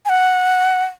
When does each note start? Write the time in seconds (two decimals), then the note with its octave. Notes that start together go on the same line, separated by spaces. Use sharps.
0.05 G#5
0.09 F#5